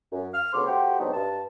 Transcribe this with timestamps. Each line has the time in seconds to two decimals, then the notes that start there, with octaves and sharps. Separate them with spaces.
0.12 F#2
0.34 F6
0.53 D2 C#3 B3 C#5 C6 D6
0.66 A3 F#4 G4 C5 F#5 G5
1.00 G#2 B2 F#3 C4 D4 D#4
1.14 G2 A5